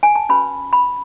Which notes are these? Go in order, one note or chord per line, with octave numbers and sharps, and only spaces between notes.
G#5
A5
C#4 F#4 B4 B5
B5